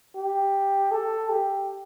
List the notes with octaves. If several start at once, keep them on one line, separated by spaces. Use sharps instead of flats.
G4
A4
G4